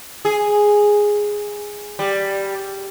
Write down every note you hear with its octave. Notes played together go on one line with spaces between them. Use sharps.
G#4
G3